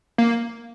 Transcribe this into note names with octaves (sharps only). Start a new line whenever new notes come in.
A#3